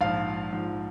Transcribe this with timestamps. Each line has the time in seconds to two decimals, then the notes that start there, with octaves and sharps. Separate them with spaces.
0.01 A#1 G#2 F3 F5
0.53 A#1 G#2 F3